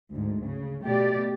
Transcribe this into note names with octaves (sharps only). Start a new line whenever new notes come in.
D2 G#2
C#3
B2 A3 G4 D5